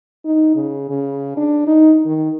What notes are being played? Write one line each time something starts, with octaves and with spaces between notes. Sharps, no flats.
D#4
C#3
C#3
D4
D#4
D#3